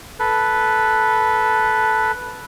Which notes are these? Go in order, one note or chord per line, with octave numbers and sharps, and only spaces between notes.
A4 B4